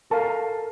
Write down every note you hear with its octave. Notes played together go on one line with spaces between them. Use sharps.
A4 A#4 F5 A5 A#5